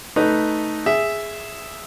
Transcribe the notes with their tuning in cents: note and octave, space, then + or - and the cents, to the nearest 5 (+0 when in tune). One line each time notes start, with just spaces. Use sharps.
A3 +0 D#4 +0 B4 +0
G#4 +0 E5 +0